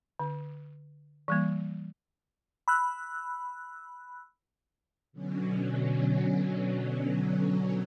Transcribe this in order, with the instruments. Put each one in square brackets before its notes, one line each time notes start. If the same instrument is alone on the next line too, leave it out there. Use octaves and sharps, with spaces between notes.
[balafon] D3
E3 G3 A#3
[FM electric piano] B5 E6 F#6
[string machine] B2 D3 F#3 C#4